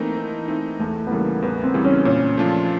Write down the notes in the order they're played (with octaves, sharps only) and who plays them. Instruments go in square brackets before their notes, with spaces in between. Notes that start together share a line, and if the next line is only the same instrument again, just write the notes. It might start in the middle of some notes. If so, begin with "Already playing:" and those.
Already playing: [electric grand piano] E3 A3 C4 D#4 [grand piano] A#3
[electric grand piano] E3
A3 C4 D#4
[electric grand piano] E2 [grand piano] A3
[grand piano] B3
[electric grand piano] C#3 E3 G3 [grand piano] A#3
[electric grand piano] E2 [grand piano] B3
[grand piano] C4
[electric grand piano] C#3 E3 G3
[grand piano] C#4
[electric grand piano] A#2 [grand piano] C#4
[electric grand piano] F3 A3 D4 F4